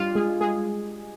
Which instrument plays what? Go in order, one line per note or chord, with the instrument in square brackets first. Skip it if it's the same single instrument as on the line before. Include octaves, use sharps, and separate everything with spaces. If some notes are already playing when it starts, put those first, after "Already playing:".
Already playing: [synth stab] G3 D4 G4 [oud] F4
[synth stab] G#3 G#4
G#3 G#4